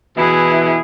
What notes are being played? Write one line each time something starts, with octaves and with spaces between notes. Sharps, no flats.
B2 E3 E4 G#4